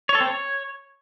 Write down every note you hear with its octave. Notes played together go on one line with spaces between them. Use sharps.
C#5
A4
C4
C#5